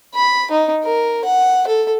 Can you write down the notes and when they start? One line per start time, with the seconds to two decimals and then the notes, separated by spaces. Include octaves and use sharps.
0.15 B5
0.51 D#4
0.84 A#4
1.25 F#5
1.67 A4